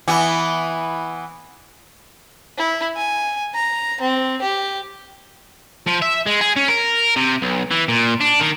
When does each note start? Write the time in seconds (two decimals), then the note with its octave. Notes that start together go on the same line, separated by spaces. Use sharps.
0.08 E3 B3
2.58 E4
2.96 G#5
3.54 A#5
4.01 C4
4.42 G4
5.87 F3
6.02 E5
6.27 G#3
6.41 G#4
6.56 C#4
6.68 A#4
7.16 C3
7.42 B1
7.71 E3
7.89 A#2
8.21 D4
8.40 D#3